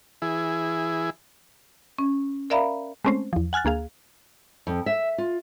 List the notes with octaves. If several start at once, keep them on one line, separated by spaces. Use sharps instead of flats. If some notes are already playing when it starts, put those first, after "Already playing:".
E3 E4 G#4
C#4
A#4 D5 E5 F5 A#5 B5
G#3 A3 C4 C#4 C5
E2 F3
F#5 G#5 F6 F#6 A6
D2 A#3 G#4 F5
F2
E5
F4